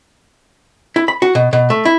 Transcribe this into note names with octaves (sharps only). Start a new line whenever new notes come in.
E4
B5
F#4
B2
B2
A3
E4